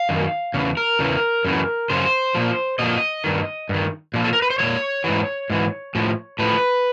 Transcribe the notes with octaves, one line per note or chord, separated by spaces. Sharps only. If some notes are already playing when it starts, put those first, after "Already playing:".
Already playing: F5
F#2 D#3
E2 C#3
A#4
E2 C#3 E3
F#2 C#3 E3
F#2 C#3 C5
A#2 F3
A#2 F3 D#5
G2 D#3
G2 D#3
A#2 F3
A4
A#4
B4
C5
A#2 F3 C#5
G#2 E3
G#2 E3
A2 F3
A2 F3 B4